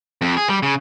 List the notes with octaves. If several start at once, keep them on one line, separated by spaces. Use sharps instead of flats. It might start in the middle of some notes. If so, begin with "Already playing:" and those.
F2
G#4
G3
C#3